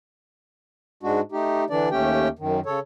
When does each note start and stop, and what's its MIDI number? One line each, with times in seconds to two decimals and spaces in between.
1.03 1.21 44
1.03 1.21 56
1.03 1.21 62
1.03 1.21 66
1.32 1.64 57
1.32 1.64 63
1.32 1.64 67
1.70 1.89 50
1.70 1.89 52
1.70 1.89 62
1.70 1.89 74
1.91 2.28 39
1.91 2.28 57
1.91 2.28 61
1.91 2.28 67
1.91 2.28 79
2.39 2.60 42
2.39 2.60 51
2.66 2.79 49
2.66 2.79 69
2.66 2.79 73